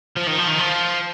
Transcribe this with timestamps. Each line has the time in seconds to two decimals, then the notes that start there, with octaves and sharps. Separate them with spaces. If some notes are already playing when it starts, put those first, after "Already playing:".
0.16 F3
0.27 D#3
0.38 F3
0.48 D#3
0.59 F3